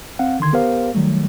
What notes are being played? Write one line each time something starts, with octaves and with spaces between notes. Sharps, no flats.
C4 F5 F#5
D3 D#3 C6 G#6
B3 G4 A#4 C5 F5
D#3 F#3 G3 A3